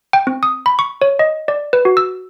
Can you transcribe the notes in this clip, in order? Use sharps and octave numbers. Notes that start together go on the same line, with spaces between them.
G5
C4
D#6
B5
C#6
C#5
D#5
D5
B4
F#4
E6